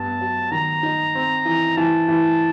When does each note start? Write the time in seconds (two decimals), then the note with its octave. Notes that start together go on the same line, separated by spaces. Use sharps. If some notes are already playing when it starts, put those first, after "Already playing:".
Already playing: G2 B3 A5
0.21 F#3
0.51 D#3 A#5
0.83 D#4
1.15 C4
1.45 E3
1.77 E3 A5
2.08 E3